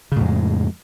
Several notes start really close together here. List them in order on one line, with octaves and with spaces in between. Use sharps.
C#3 A2 F2 G#3